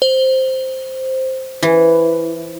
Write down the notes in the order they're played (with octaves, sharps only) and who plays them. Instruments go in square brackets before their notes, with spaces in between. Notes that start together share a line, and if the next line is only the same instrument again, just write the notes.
[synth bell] C5
[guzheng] E3